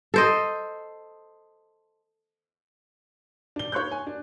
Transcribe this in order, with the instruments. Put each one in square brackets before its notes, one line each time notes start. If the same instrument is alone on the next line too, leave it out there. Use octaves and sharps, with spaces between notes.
[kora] A4 C5 D#5
[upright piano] D4 G7
C#5 C6 C#6 F#6 G6
G#5
D4